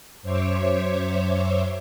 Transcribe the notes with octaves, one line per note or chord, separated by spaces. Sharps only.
F#2 C5 C#5 E5 D6